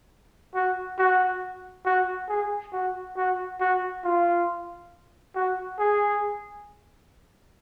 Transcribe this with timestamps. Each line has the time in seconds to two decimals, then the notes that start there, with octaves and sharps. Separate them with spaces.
0.55 F#4
0.98 F#4
1.86 F#4
2.29 G#4
2.73 F#4
3.17 F#4
3.61 F#4
4.04 F4
5.35 F#4
5.79 G#4